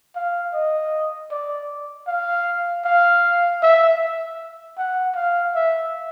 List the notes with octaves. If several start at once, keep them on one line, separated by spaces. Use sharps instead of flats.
F5
D#5
D5
F5
F5
E5
F#5
F5
E5